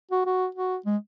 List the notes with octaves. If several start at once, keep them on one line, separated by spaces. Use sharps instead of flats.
F#4
F#4
F#4
G#3